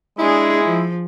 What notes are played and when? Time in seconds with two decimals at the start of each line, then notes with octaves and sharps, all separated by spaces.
0.19 G#3 D4 E4 G#4
0.64 F3